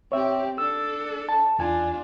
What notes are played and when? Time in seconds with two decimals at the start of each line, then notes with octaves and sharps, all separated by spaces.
0.12 C4 G4 C#5 E5
0.58 D4 A4 E6
1.29 A5
1.59 E2 D4 F4 G#5